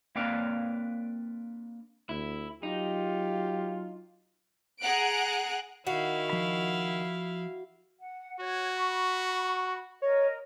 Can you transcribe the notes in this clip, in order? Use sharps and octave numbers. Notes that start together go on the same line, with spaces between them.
A#3 C4 D4 B4 D5 F5
D2 E4
F#3 D#4 F4 G4
G#4 F#5 A#5 F#6 D7
D#3 E4 F#4 F5
F3 B5
F#5
F#4 C#5
B5 C#6
A#4 C#5 D#5